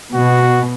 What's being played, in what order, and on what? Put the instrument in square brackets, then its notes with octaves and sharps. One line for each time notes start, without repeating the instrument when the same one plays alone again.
[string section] B2 [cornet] F#4